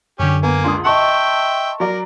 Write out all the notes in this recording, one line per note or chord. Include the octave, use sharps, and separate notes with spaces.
F#2 D3 C#4 G4
A#3 B3 G#5
C#2 D4 C6 D#6
D#5 E5 G5 A5 C6 C#6
F#3 A#4 D5 A#5